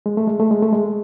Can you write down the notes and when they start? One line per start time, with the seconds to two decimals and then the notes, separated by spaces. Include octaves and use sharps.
0.06 G#3
0.17 A3
0.27 G#3
0.39 A3
0.51 G#3
0.62 A3
0.73 G#3